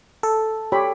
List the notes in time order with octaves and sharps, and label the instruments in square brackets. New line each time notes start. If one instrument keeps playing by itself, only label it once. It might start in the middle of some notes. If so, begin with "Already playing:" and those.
[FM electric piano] A4
[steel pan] G4 C#5 B5